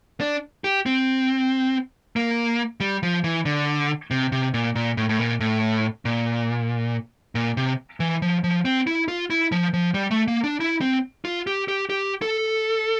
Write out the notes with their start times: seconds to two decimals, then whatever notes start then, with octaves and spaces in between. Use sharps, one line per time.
0.21 D4
0.64 G4
0.86 C4
2.16 A#3
2.80 G3
3.03 F3
3.24 E3
3.45 D3
4.11 C3
4.32 C3
4.54 A#2
4.75 A#2
4.97 A2
5.09 A2
5.19 A#2
5.40 A2
6.05 A#2
7.35 A#2
7.57 C3
8.00 E3
8.22 F3
8.44 F3
8.65 C4
8.87 E4
9.08 F4
9.30 E4
9.52 F3
9.74 F3
9.94 G3
10.11 A3
10.28 A#3
10.44 D4
10.60 E4
10.81 C4
11.25 F4
11.47 G4
11.68 G4
11.90 G4
12.22 A4